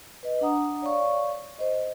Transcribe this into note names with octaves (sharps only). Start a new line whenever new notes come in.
B4 D#5
D4 F#5 A#5 D#6
C#5 D5 F5 C#6
C5 D#5